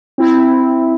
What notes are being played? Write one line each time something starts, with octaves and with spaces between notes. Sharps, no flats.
C4 E4